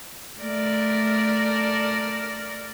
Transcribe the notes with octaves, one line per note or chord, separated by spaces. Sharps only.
A3 A#4 D5